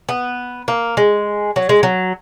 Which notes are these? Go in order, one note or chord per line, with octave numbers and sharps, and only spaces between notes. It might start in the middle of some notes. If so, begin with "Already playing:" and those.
B3
A#3
G#3
F#3
G#3
F#3